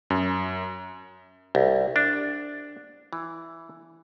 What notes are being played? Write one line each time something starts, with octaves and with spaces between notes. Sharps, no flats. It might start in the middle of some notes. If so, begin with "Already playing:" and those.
F#2
C2
D4
E3